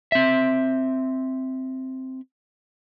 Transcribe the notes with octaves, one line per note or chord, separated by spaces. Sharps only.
C4 E5